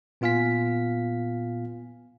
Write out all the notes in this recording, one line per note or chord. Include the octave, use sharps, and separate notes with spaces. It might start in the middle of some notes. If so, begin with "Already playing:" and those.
A#2 B3 F4 F5 G#5 B6